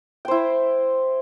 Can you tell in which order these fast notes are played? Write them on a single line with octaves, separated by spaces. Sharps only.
G5 C5 E4